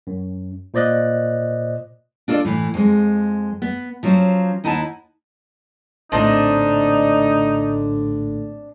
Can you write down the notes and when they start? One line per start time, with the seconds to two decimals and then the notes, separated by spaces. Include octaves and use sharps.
0.07 F#2
0.74 A#2 C5 D5 D#5 F#6
2.28 D4 F4 A4 C#5 D5
2.45 A2 E3
2.74 F2 G#3
3.62 B3
4.03 F3 F#3 C#4 C5
4.64 D#2 D#4 E4 F#5 G#5 A5
6.12 A#1 A2 D3 C4 D4 D#4 D#5